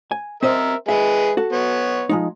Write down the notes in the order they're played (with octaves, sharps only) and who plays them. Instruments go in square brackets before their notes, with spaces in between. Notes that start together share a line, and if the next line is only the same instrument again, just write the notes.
[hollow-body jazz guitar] G#5
[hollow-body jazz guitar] C4 C5 D#5 [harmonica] A#4 E5
[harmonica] G#3 G#4 B4 [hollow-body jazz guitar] E5
[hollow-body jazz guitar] F#4 A4
[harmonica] B3 C#5
[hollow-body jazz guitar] F3 G#3 D#4